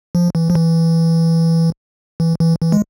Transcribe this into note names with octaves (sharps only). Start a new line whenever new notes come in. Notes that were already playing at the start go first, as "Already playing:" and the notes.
F3
E3
F3
E3
E3
E3
E3
G#3